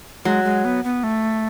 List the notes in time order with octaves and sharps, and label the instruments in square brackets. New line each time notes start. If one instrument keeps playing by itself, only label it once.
[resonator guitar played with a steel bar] F#3 [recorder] G#3
[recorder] G#3
B3
B3
A3